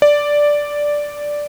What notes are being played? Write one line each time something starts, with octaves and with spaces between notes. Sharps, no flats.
D5